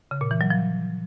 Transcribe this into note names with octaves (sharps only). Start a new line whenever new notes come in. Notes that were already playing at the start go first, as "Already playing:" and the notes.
C#3
A#2
E3
F#3
F3